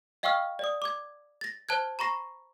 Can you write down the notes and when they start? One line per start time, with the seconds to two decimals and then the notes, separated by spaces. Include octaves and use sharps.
0.23 D#5 F5 G5 C#6 E6 F6
0.59 D5 D#6
0.82 D6 G#6
1.41 A6 A#6
1.69 C5 A5 F#6 G#6
1.99 A#5 B5 C#6 A#6 C7